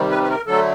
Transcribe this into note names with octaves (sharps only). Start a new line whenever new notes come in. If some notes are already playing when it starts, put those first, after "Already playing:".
Already playing: C3 D#3 G3
B4
B4
A#4
D3 F#3 A3 A4